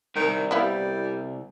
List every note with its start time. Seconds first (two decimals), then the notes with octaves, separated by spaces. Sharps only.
0.16 C2 D#3
0.51 G3 B3 E4 F5